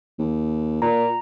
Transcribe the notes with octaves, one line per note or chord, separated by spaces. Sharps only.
D#2
A#2 A#5